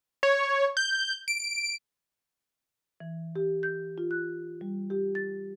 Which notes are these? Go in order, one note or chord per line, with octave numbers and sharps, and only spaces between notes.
C#5
G6
D7
E3
G4
G6
F4
F#6
G3
G4
A6